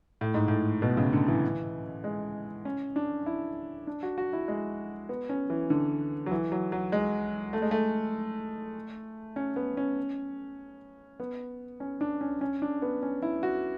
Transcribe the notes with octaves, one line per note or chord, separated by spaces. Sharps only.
A2
G#2
A2
B2
C#3
D3
E3
G#3
C#4
D4
E4
D4
F#4
F#4
E4
G#3
B3
C#4
E3
D3
F#3
E3
F#3
F#3
G#3
A3
G#3
A3
C#4
B3
C#4
B3
C#4
D4
C#4
C#4
D4
B3
C#4
E4
F#4